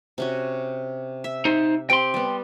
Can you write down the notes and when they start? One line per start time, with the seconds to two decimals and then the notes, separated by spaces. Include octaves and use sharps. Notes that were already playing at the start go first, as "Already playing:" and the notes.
0.18 C3 C#4 F#4
1.24 E5
1.45 D#4 C5
1.90 C4 G4 G5 C6
2.14 G3 B3